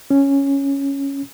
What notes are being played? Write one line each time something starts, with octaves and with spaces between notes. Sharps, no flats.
C#4